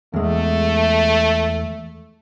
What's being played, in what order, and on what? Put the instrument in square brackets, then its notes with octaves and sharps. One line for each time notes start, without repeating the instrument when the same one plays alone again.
[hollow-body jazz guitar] E2 G#3 [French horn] A3